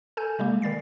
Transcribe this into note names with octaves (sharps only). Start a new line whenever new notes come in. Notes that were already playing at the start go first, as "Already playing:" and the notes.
A4 G#5 G6
C3 G3 G#3 A#3
D#3 G3 A6 C7